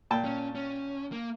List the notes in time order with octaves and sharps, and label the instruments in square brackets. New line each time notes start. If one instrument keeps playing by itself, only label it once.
[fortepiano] A#2 G5 A5
[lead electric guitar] C#4
C#4
A#3